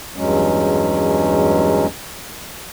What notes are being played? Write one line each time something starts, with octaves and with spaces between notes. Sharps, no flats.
E2 G2 F#3 G#3 C#4